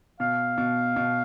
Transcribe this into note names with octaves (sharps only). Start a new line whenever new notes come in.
B2 F5
B2
B2